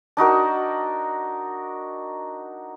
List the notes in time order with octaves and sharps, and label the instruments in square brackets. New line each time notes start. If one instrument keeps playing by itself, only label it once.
[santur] D4 D#4 F#4 A#4